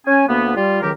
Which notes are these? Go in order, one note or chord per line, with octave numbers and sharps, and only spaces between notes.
C#4 G#5
D2 A#3 B3
G3 F4
C#2 D#3 F#3 G4 A#4